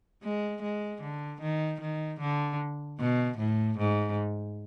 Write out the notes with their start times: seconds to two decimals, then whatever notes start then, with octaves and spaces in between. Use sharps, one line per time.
0.23 G#3
0.62 G#3
1.02 D3
1.41 D#3
1.81 D#3
2.20 D3
2.99 B2
3.38 A2
3.78 G#2